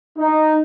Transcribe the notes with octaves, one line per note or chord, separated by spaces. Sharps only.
D#4